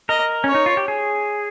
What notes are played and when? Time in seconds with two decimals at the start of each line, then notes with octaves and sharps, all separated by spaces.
0.09 A#4 D#5
0.44 C#4 C#5
0.55 D#4
0.66 F4
0.77 G4
0.88 G#4